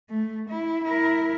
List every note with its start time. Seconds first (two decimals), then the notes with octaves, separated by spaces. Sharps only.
0.10 A3
0.49 E4
0.84 E4 A#4